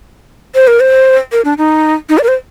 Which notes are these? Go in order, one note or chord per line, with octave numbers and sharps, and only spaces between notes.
C5
A#4
C5
A#4
D4
D#4
D#4
D5
A#4
C5